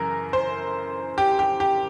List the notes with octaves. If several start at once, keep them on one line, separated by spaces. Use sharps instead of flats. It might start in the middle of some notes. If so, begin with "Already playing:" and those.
Already playing: F#2 C#3 E3 A#4
C5
G4
G4
G4